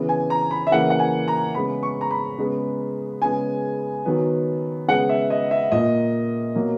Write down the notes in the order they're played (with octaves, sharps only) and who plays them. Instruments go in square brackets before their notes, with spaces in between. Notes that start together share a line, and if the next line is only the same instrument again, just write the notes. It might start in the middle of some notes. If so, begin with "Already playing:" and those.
Already playing: [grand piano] C#3 E3 B3
G#5
A#5
B5
E5
C#3 E3 A#3 F#5
F#5
G#5
A#5
C#3 G#3 B3 B5
C#6
A#5
B5
C#3 G#3 B3
C#3 G#3 B3 G#5
D#3 F#3 B3
C#3 G#3 B3 F#5
E5
D#5
E5
A#2 A#3 D#5
B2 F#3 A#3